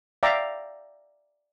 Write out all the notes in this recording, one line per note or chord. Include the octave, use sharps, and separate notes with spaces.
D5 E5 F5 G5 A#5 D6